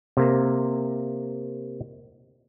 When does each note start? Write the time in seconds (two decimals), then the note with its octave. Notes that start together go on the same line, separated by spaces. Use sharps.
0.17 C3 A#3